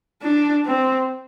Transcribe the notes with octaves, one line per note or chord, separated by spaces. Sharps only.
D4
C4